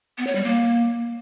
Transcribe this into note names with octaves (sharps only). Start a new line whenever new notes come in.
B3
C#5
G3
A#3